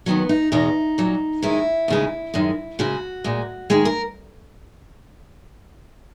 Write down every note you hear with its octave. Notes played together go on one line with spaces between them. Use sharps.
D#2 D#3 F#3 B3
D#4
E2 B2 G#3 D#4
A#2 F#3
F#2 D#3 G#3 E4
D#2 C#3 G#3
F#2 D#3 G#3
F#2 C#3 G#3 F#4
A#2 G#3
D#2 D#3 G#3 G#4
A#4